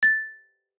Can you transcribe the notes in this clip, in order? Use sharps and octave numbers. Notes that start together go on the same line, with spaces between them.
A6